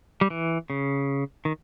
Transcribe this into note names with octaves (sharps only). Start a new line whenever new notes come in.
G3
E3
C#3
D#3